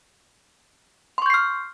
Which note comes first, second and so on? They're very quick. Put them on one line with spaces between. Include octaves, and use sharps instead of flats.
C6 C#6 G6 C7 F6